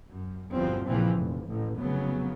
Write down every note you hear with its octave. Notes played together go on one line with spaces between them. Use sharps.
F#2
G1 E2 G2 B2 F3 C4
A#1 A#2 C#3 E3 F3 C4
F1
A1
F1 C#3 F#3 B3